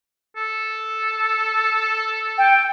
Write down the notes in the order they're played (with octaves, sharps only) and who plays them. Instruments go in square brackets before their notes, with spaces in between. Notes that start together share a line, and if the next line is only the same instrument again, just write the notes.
[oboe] A4
[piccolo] G5